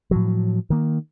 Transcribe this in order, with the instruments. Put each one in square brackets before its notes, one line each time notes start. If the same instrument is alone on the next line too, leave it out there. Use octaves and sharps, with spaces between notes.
[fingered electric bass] A2 F3 F#3
D#3 A#3